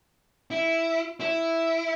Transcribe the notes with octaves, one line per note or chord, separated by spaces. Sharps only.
E4
E4